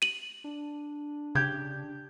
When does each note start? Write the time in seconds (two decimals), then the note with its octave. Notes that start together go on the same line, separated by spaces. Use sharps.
0.02 D#7 F#7
0.44 D4
1.35 C#3 G4 G6 G#6